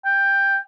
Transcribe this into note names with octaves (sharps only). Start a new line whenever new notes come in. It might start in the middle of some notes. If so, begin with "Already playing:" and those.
G5